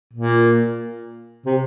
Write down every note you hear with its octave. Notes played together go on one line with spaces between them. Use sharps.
A#2
C3